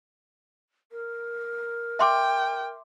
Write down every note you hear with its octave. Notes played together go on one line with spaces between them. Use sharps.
A#4
E5 G5 C6 D6